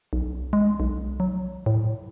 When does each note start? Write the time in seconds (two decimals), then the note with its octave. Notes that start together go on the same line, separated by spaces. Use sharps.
0.13 B1
0.53 G#3
0.80 B1
1.20 F#3
1.66 A2